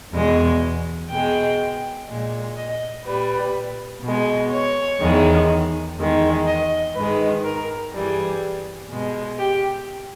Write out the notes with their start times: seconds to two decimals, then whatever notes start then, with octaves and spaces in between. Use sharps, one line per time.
0.13 E2 B2 G#3
1.10 B2 G#3 G5
2.09 A#2 G#3
2.57 D#5
3.05 A#2 G3 B4
4.03 B2 G#3
4.52 C#5
5.01 E2 D#3 G#3
5.97 E2 D#3 G#3
6.47 D#5
6.95 G#2 D#3 G#3 B4
7.44 A#4
7.93 G2 E3 G3 G#4
8.90 B2 G#3
9.38 G4